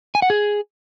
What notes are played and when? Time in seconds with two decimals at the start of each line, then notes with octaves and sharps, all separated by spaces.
0.15 G#5
0.22 F#5
0.30 G#4